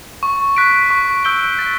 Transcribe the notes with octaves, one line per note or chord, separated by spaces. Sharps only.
C#6
F#6 B6 D7
C#6
E6 G6 D7 G7
A6